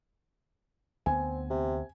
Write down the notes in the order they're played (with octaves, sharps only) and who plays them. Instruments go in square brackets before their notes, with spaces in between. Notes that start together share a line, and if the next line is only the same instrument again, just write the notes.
[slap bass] D2 B3 [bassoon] C4 [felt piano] G#5
[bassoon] C3